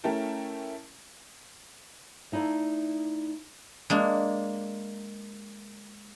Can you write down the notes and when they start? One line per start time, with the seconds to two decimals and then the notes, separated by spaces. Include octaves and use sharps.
0.04 A3 C#4 E4 A#4 G5 A5
2.32 A3 D#4 E4 D5 F5
3.90 G#3 A#3 D4